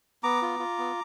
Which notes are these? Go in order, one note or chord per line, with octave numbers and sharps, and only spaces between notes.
B3 A#5 D6
F4
F4
B3